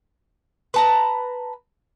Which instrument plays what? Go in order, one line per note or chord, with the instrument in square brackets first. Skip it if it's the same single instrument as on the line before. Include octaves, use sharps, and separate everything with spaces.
[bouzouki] B4 A5 A#5